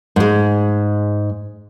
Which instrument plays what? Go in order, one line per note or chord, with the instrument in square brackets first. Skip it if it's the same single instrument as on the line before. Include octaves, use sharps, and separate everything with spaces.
[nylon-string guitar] G#2 G#3